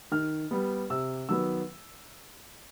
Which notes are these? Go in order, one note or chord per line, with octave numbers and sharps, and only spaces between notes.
D#3 F6
G3 B3
C3 E6
D#3 F#3 B3 E6